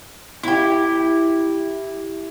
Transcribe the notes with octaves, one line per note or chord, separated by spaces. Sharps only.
E4 G4